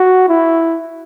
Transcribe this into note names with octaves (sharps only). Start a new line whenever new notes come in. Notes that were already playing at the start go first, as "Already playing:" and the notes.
Already playing: F#4
E4